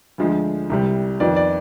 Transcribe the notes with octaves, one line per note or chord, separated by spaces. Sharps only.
D2 D3 F3 G#3
C2 C3 G3
F2 D#3 B3 F4 D5
D5